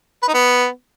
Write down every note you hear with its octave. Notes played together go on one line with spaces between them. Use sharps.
B4
D#4
B3